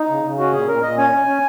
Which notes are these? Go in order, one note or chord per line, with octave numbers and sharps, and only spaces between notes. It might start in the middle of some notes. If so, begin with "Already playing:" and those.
Already playing: D#4
C#3
C#3
C#4 F#4
A#2 G#4
A#2 A#4
A#2 D#5
C#4 G#5
C#4
C#4